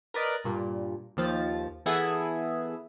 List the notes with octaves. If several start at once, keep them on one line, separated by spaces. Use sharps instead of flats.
A#4 B4 D5 D#5
G2 A#2
D#2 F3 A6
E3 B3 E4 G#4 A4